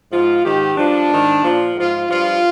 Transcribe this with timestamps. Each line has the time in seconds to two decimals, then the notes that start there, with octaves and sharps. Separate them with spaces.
0.11 G#2 F3 F4
0.43 G#2 D#3 G4
0.76 G2 F3 D4
1.09 G#2 D#3
1.43 A#2 F3
1.75 G#2 F3 F4
2.08 G2 F3 F4